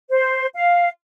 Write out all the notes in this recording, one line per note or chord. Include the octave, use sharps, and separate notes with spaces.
C5
F5